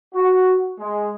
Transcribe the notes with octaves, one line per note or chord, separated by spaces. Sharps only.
F#4
G#3